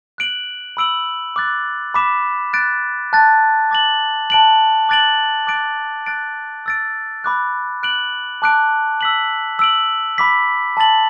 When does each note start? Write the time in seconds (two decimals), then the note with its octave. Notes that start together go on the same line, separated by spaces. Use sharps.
0.18 F#6 D7 F#7
0.77 B5 E6 D7 F#7
1.36 D6 F#6 A6
1.94 B5 D6 B6 E7
2.53 F#6 A6 D7
3.13 A5 F#6 A6
3.71 D6 A6 F#7
4.30 A5 F#6 D7 F#7
4.89 D6 F#6 A6 D7 F#7
5.47 D6 F#6 A6 D7
6.06 F#6 A6 D7
6.66 E6 A6 D7
7.24 B5 D6 F#6
7.83 F#6 D7 F#7
8.42 A5 D6 F#6 D7
9.01 E6 B6 F#7
9.59 E6 D7 F#7
10.18 B5 D6 B6
10.77 A5 D6 A6 F#7